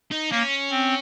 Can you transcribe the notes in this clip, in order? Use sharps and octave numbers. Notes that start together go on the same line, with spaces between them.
D#4
A#3 C#4
C4